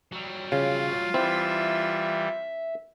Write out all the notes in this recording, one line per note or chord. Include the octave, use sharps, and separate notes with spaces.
F#3 G3
C#3 F4
E3 G3 C4 E4 E5